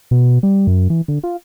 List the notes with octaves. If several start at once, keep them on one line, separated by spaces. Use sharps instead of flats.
B2
G3
F#2
E3
D3
F4